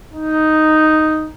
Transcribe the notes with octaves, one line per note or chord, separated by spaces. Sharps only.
D#4